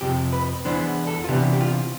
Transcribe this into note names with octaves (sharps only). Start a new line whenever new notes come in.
F2 C3 F3 G4
B4
E2 C3 E3 B3 D4 C5
A4
F4
C3 E3 B3 D4 G4
G4
F4